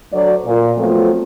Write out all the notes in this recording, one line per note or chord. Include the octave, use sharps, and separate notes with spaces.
D2 F#3 D5
A#2
F3 F#3 A3 B3 C4 F4